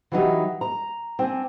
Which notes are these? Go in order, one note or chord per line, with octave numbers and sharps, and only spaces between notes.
E3 F#3 D#4 G4
A#5
C4 D4 G#5